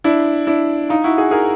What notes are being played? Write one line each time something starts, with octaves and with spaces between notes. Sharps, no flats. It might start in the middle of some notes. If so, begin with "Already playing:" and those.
D4 E4
D4 E4
D#4 F4
E4 F#4
F#4 G#4
G#4 A#4